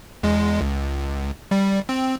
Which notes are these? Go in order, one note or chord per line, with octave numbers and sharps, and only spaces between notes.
E2 G#3
C#2
G3
C4